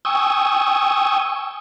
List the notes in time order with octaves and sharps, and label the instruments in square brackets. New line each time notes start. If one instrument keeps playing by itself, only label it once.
[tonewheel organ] G5 G#5 C#6 D#6 E6